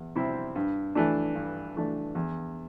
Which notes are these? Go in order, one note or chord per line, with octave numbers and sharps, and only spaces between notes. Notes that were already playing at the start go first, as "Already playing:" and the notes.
Already playing: E2
C3 G3 C4 E4
G2
E3 A3 D4
G2
E3 A3 D4
E2